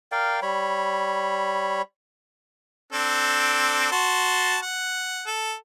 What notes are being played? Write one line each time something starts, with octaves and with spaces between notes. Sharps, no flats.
A#4 D5 F5 G5
G3 C#5 B5
C4 D4 A4
F#4 A5 C6
F#5
A4